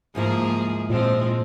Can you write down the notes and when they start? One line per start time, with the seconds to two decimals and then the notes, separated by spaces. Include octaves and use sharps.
0.15 D2 G#2 F3 A#3 E4 G#4
0.90 A#2 F3 G#3 C4